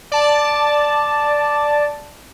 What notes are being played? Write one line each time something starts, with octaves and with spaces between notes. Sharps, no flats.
D5 A5